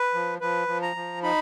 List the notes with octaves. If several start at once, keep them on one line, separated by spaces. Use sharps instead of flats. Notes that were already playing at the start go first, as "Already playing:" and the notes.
Already playing: B4
F3
F3 B4
F3
A#5
F3
D#4 B5